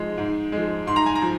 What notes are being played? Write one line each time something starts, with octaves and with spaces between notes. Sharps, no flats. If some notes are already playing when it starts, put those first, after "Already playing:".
Already playing: G#2 F3 G#3
G#2
F3 G#3
G#2 C6
A#5
G#5
A#5
F3